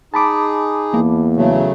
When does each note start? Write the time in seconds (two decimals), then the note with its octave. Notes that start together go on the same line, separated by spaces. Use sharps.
0.14 D#4 G#4 A5 B5 D6
0.94 E2 A#3
1.37 C#3 F#3 A3